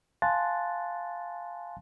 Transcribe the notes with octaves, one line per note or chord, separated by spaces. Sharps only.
F5 G#5 A5 C6 F#6 A6